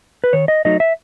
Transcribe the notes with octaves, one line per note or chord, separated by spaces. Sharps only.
B4
D#3 C#5
D#5
F#3 A3 D#4 D#5
E5